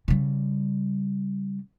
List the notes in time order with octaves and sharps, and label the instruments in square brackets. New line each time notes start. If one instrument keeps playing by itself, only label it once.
[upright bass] C#3 G3